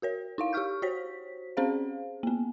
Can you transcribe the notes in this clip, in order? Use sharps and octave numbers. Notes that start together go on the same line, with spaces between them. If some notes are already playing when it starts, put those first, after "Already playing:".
F#4 A#4 C#5
D#4 E4 F5
G4 F5 C#6 F6 G6
F#4 C5 C#5 B6
C4 C#4 G#4 C5 F5
A#3 B3